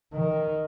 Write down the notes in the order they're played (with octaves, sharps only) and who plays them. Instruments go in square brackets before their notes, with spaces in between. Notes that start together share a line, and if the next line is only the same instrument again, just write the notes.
[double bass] D#3